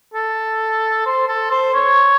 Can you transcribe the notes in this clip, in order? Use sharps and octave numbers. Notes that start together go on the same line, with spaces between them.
A4
C5
A4
C5
C#5